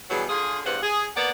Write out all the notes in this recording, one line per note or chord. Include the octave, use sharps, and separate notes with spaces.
B2 E3 F#3 G3 G#4
D3 F4 G#4
E2 G2 B4 C5 F#5
G#4
A#3 B3 D5 F#5